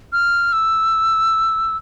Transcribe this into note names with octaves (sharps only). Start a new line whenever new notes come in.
F6
E6